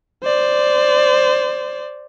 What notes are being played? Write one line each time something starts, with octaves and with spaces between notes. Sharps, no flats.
C5 D5